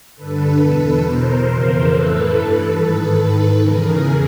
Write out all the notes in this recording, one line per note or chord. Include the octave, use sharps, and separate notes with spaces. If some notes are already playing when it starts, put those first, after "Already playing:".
G2 D3 A4 B4
E2 B2
E2 B2 A#4 C5
F2 C#3 E3
A2 E3 A4 B4
G2 E3
G#2 D#3 A4 B4
G#2 D#3
E2 C#3 E3 G#4 A#4